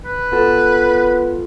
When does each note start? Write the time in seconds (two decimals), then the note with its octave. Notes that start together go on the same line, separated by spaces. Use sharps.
0.05 B4
0.32 B3 F4 A4